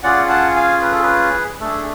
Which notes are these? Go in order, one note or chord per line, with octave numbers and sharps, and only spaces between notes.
C#4 F4 G#4 D5 F#5
F#5 A5
F5 G#5
B4
A4
G#4 B4
A3 D4 G#4 A4